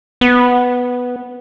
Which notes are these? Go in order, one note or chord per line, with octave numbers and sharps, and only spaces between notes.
B3